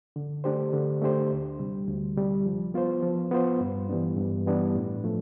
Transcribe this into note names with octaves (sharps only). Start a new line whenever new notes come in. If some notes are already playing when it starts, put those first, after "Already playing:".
D3
A3 D4 G4 C5
D3
A3 D4 G4 C5
D2
C3 G3
D2
C3 G3
F3
B3 F4 C5
F3
B3 F4 C5
G2
E3 G3 B3 D4
G2
E3 G3 B3 D4
A2
F3 A3